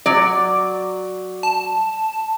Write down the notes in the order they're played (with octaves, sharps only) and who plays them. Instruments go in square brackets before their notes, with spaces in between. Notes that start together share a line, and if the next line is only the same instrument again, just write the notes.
[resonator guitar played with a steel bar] F#3 D5
[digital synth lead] A5